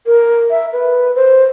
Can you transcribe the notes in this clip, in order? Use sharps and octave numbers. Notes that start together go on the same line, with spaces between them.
A#4
E5
B4
C5